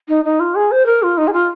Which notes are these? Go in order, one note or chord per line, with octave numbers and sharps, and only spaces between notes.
D#4
D#4
F4
G#4
C5
A#4
F4
D#4
G#4
F4